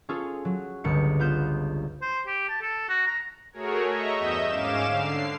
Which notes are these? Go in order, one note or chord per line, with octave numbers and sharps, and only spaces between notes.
C#4 F4 G#4 A4
F#3
G1 C#2 C#7
B3 F4 G6 E7
C5
G4
A5
A4
F#4
A#5
A3 F#4 G#4 A#4 C#5
D#5 E5 A#5 C#6
E2 G2 D#5 E5 G6 E7
G#2 C#4 F5 D6 E7
D3 C7